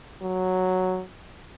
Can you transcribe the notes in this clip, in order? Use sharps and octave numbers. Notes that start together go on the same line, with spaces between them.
F#3